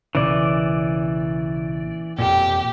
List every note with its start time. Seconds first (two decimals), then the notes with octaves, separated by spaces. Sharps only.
0.15 B1 A#2 C#3 E3 D5
2.18 E1 F2 A#2 G4